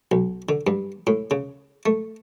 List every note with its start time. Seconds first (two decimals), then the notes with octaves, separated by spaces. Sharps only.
0.12 B1
0.49 D3
0.67 G2
1.07 A2
1.31 C#3
1.86 A3